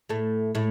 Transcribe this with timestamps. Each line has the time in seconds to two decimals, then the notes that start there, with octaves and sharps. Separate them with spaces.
0.09 A2 A3
0.55 A2 A3